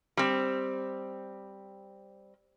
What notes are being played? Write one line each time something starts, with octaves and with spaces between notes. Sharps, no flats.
G3 C4